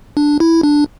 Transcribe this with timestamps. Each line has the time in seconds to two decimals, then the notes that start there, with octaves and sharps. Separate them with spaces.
0.17 D4
0.40 E4
0.63 D4